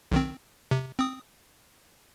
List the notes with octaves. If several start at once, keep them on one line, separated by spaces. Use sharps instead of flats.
B1 D#3 C4
C3
C4 D#6